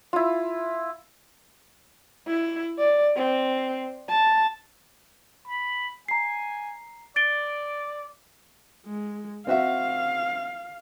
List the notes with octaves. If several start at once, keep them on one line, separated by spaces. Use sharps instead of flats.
E4 F4
E4
D5
C4
A5
B5
G#5 A#5 C7
D5 A6 D7 G7
G#3
C4 F#4 E5 F5